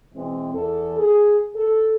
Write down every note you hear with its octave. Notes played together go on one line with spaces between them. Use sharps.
B2 E3 G#3 C4
E2 A4
G#4
A4